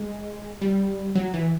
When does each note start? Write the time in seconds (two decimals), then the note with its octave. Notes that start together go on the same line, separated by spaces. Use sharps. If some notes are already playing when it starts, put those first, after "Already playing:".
Already playing: G#3
0.61 G3
1.15 F#3
1.34 E3